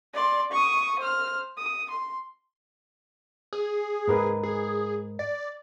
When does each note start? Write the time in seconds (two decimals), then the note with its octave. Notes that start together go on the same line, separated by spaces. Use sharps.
0.14 D5 C6
0.52 C#6 D#6
0.99 C5 F6
1.58 D#6
1.90 C6
3.53 G#4
4.08 G#2 A#4 B4
4.43 G#4
5.19 D5